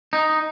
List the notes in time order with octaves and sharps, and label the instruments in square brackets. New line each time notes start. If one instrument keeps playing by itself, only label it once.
[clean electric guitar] D#4